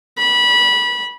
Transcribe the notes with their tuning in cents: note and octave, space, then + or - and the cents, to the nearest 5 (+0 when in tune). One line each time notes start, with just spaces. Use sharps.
B5 -20